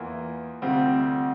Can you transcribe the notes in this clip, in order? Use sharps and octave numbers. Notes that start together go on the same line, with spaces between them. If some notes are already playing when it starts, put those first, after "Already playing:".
Already playing: E2 E3 A#3 F4
D2 C3 G3 C4 F4